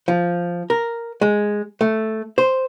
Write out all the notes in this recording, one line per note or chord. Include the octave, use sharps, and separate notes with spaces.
F3
A#4
G#3
A3
C5